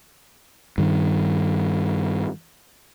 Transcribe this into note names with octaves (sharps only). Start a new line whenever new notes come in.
G2 D#3